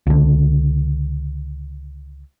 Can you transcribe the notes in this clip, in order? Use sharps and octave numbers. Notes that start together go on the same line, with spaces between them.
C#2 D3